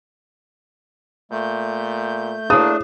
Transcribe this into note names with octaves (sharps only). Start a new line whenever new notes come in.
A#2 A3 G6
A3 A#3 D4 E4 G#4 D#6